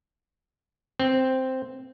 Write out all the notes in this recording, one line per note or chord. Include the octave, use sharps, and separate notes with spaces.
C4